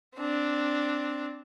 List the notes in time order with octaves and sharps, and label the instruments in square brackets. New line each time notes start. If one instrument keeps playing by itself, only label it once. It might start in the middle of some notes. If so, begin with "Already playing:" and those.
[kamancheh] C4 D4